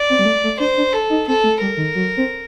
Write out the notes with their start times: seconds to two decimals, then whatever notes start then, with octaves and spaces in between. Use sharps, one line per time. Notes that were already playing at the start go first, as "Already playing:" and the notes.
Already playing: D5
0.10 C4
0.19 G3
0.26 A3
0.44 A3
0.60 D4 C5
0.77 D4
0.93 A4
1.10 D#4
1.27 C4 A4
1.44 A3
1.61 G3 A#4
1.77 D#3
1.95 F#3
2.17 C4